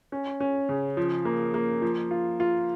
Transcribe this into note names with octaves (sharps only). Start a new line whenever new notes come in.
C#4
C#4
C#3
F3
A#3
A#3
F3
F4
F4